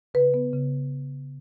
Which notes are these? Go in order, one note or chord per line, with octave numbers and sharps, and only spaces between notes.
C#3 B4
B3
C#3